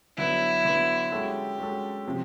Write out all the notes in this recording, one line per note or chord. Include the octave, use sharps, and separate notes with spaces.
D3 F#3 B3 E4
D3 F#3 B3
G#3 C#4 F#4 G4 A4
G#3 C#4 F#4 A4
C3 F3